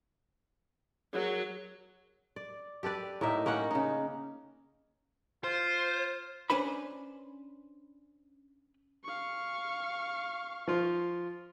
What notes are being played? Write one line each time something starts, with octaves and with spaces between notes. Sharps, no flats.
F#3 G#4 A#4
D5
G4 A4 B4 D5
A2 A#3 D#4 E5
A#3 C#4 D#4 F#5
C#3 D#4
F4 C5
C#4 D4 B4 C5 B5
F5 C#6
F3 F4